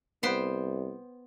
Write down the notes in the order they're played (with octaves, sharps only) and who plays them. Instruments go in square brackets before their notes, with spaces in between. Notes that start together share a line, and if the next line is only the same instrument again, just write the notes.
[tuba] C2 [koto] B3 C5 G5